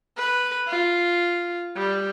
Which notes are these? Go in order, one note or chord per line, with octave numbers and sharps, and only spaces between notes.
B4
F4
G3